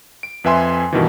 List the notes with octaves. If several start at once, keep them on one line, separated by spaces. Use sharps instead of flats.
D7
F2 B4 E5 G#5 C6
G2 B2 D#3 E3